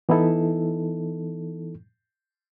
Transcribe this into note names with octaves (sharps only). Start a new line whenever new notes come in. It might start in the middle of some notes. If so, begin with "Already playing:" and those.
E3 B3 D#4 E4 A4